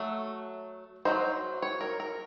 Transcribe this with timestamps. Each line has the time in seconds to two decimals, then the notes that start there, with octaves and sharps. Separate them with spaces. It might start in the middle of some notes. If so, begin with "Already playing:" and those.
Already playing: F#3 A3
1.05 F#3 A3 D#4 C5
1.62 C#5
1.81 A#4
2.00 A#4